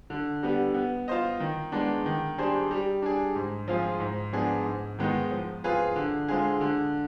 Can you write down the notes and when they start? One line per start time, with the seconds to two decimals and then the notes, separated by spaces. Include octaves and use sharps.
0.10 D3
0.43 G3 B3
0.74 B3
1.08 F4 C5 D#5
1.40 D#3
1.72 G#3 B3 D4
2.06 D#3
2.38 G3 D4 G#4 C5
2.71 G3
3.02 D4 G#4
3.35 G#2
3.68 F3 C4 F4 G#4
4.00 G#2
4.33 F3 B3 D4 G#4
4.66 G#2
4.99 D#3 G#3 B3 D#4
5.31 F3
5.64 C4 F4 G#4 B4
5.96 D3
6.28 G#3 C4 F4 G#4
6.61 D3